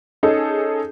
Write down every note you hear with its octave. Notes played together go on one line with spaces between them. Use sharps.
C#4 D#4 G#4 A4